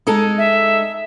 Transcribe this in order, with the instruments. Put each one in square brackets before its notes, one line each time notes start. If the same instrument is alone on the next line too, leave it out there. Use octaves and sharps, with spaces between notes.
[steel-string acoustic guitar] G#3 D#4 A4
[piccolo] E5